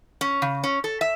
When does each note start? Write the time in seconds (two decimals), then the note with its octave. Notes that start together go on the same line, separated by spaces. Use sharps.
0.21 C#4
0.42 C#3
0.64 C#4
0.84 A4
1.01 E5